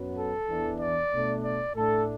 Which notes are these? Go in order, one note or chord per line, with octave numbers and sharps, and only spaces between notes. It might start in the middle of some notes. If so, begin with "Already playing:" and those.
Already playing: F#2 F#3 B3
A4
E2 E3 D4
D5
B2 A3 D4
D5
A2 A3 D4 A4